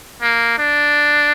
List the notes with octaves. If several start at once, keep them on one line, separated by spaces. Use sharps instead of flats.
A#3
D4